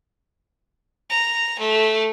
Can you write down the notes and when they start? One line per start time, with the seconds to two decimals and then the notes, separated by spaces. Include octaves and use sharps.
1.10 A#5
1.59 A3